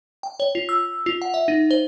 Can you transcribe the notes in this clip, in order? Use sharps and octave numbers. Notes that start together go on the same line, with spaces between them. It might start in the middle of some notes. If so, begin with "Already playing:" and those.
G5
C#5
F4
E6
F4
F#5
E5
D#4
C5